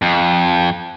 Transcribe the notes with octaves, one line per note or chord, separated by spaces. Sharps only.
F2